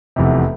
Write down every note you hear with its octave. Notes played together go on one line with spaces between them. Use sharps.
F1 E2 C3